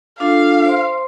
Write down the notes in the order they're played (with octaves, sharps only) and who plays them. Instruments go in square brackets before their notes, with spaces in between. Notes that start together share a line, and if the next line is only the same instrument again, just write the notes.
[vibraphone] D4 F4 A4 [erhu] F5
[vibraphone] C5 C6